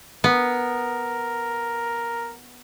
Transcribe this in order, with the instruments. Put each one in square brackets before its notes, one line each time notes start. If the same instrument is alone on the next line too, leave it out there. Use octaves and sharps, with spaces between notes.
[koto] B3 [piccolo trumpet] A#4